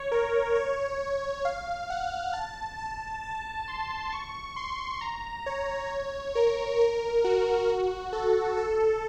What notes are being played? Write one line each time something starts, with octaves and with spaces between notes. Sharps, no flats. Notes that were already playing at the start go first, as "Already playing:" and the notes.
Already playing: C#5
A#4
C#5
F5
F#5
A5
A5
A5
C6
C#6
C6
A#5
C#5
A#4
A#4
F#4
F#4
A4
A4